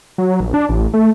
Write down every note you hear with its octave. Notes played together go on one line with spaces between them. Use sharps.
F#3
A#1
D4
A1
A3